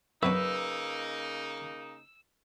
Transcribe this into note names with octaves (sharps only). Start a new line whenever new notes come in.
F#2 C#3 F#3 A#3 C#4 D#4 B4 E6